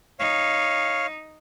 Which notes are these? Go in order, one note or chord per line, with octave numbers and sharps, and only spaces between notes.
D#4 C#5 F5